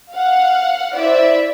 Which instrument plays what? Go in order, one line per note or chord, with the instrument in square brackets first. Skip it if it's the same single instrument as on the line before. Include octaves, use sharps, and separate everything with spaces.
[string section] F5 F#5
E4 C5 D5 E5